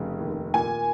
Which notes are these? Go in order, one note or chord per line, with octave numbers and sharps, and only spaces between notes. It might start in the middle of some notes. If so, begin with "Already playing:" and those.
Already playing: F1 C#3
D#2
A#2 G#5